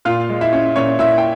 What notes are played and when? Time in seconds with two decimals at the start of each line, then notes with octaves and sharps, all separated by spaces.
0.05 A#2 F4 F5
0.29 G#3
0.41 E4 E5
0.53 C#4
0.76 A#2 C#4 C#5
0.99 A#2 E4 E5
1.18 G5